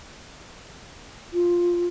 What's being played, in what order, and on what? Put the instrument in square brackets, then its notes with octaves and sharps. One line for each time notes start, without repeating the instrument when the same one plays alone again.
[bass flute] F4